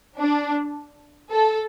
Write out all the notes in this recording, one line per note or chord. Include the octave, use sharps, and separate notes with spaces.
D4
A4